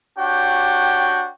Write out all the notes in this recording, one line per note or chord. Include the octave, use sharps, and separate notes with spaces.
D4 F#4 G4 C#5 G5